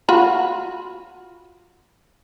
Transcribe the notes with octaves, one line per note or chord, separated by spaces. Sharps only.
F4 F#4 B5